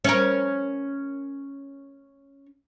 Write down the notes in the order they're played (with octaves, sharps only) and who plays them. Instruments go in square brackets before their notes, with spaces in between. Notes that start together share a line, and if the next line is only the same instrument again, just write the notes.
[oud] C#4 A#4